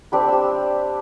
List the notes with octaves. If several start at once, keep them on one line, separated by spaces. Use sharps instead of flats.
C4 D4 G4 B4
G4 E6